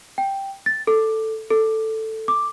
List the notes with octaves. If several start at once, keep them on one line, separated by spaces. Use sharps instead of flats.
G5
A6
A4
A4
D6